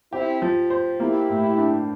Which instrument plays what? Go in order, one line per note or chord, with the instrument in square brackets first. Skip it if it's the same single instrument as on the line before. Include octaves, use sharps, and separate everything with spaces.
[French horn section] C4 E4 [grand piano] G4
[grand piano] F3
C5
[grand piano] A#3 [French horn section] E4 G4
[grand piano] A2
D4